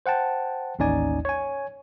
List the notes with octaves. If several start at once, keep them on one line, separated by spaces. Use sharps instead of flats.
C5 F#5 G5 A5
A1 D#2 C#4 D#4 D5 G#5
C#5 G#5